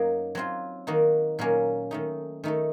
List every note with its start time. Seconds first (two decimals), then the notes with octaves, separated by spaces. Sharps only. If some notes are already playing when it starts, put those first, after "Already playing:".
Already playing: F#2 F#3 A#3 D#4
0.35 F#3 C4 F4
0.87 D#3 A#3 D#4 F#4
1.39 A#2 F#3 A#3 C#4
1.91 D#3 A3 D#4
2.44 D#3 A3 D#4 A4